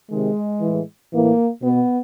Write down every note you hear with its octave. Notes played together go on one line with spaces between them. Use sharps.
C3 D#3 G#3
A2 E3
A2 E3 A#3
B2 B3